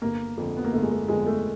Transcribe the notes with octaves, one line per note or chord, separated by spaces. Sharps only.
G1 A#3
F2 D3
B3
A#3
G1 A3
G#3
A3
F2 D3 G#3
A3